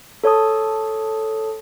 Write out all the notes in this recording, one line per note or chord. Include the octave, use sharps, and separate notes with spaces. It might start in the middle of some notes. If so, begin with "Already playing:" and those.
A4 C#5 A5 D#6